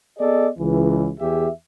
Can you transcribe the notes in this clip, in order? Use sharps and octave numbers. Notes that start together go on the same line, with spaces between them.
B3 G#4 A4 D5 D#5
C#2 E3
E2 G4 G#4 E5